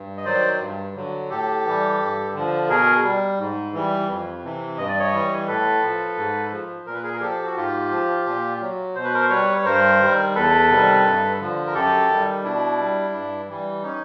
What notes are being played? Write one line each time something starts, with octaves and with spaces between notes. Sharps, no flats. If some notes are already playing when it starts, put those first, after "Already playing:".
Already playing: G2
D#5
D#3 F#3 C5 D5
G2
D3 F#3
A2 G4 A4
E3 G3
G2
D3 F3
B2 G#4 A#4
G3
G#2
E3 G3
F2
C3 E3
G2 D#5
D5
C#5 D#5
E3 G3
A2 A4 B4
F3
G#2
F3
A#2 A#4
B4
G#4 A#4
A#4
F3 G4 A4
F#4
G#2 F4 G4
F3
A#2
F#3
B2 C5
B4
A#4 C5
G3 B4 C#5
C#5
G2 A#4 C5
D#3 G3
E2 A4 B4
C3 D#3 G3
G2
D3 F3
A#4
F#2 G4 A4
D#3 G3
B2 D4 E4
G3
G2
E3 G3
C#4 D#4